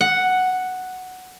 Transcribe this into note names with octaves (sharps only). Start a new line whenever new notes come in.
F#5